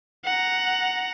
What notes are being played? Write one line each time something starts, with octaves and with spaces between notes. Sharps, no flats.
F#5 A#5